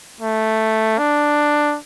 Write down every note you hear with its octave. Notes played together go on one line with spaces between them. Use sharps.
A3
D4